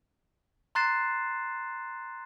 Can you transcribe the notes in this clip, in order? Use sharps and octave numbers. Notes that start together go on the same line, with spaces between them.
A#5 C6 F#6 A6 C7 E7